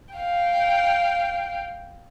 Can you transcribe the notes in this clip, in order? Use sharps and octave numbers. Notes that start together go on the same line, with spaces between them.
F5 G5